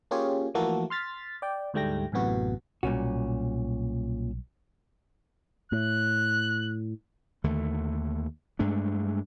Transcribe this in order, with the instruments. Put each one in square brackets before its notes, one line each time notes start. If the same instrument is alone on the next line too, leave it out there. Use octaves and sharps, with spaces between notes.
[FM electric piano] A#3 C#4 F4 G4 G#4 C#5
E3 F3 A3 A#3 F#4 A4
C6 F6 A6 B6
D5 G5
D2 G#2 G3 A3 G5 A#6
A1 F#2 A2 C3 B3 F#4
[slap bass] B1 G3 [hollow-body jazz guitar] A#2 C#4 F#4
[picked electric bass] A2 [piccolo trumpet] F#6
[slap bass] D#2 D3 A3
G2 G#3 A3 D4